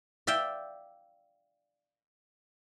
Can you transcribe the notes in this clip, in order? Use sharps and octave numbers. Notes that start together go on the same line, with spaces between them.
D5 E5 F5 G5